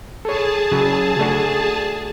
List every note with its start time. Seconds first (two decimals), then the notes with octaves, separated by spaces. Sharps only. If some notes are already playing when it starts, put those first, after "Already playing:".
0.25 G#4 A4 C#5 A5
0.72 C#3 F#3
1.19 A3 D4 F#4